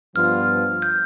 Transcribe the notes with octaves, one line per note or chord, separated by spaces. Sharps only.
G2 F3 B3 F4 F6
G6